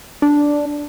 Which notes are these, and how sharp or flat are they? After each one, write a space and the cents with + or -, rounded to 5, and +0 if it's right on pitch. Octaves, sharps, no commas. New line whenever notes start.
D4 -5